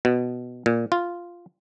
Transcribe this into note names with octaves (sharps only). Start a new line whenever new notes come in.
B2
A#2
F4